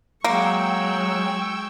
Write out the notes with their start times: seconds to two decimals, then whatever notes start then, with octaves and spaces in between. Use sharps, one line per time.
0.24 F#3 G#3 A#3 G5 C#6 E6